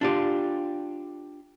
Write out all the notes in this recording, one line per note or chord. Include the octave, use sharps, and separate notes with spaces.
D4 F4 G4